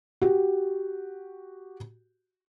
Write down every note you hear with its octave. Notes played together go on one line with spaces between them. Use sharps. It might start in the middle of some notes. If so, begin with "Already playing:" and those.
F#4 G4